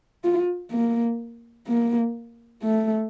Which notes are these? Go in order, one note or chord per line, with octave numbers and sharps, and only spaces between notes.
F4
A#3
A#3
A3